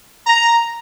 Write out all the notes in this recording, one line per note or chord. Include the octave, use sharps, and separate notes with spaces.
A#5